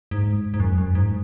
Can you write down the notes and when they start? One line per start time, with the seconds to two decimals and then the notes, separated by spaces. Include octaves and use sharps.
0.11 G#2
0.54 G#2
0.60 F#2
0.78 F#2
0.95 G#2